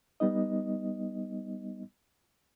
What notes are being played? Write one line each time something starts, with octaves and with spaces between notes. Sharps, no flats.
G3 B3 D#4 D#5